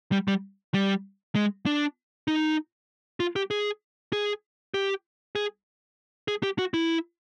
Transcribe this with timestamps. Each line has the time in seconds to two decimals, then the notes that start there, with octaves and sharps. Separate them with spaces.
0.12 G3
0.28 G3
0.74 G3
1.35 G#3
1.66 D4
2.28 D#4
3.20 F4
3.36 G4
3.51 G#4
4.13 G#4
4.74 G4
5.35 G#4
6.28 G#4
6.43 G4
6.59 F#4
6.74 E4